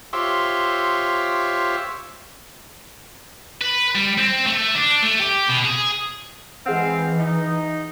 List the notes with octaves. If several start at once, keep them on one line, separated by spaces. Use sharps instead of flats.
F4 G4 C5 C#5 E5
B4
G3
C4
A3
D4
A3
G4
B2
G#4
E3 G#3 C4 G#4 F5 F#5
D#4